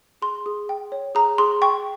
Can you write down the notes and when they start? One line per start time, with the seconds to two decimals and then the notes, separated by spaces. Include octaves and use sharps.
0.22 G#4 C6
0.46 G#4
0.69 G5
0.92 C#5
1.15 G#4 A#5
1.38 G#4 C6
1.62 G5 C#6